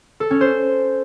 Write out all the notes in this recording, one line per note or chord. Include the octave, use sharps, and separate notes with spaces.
A4
C#4
C5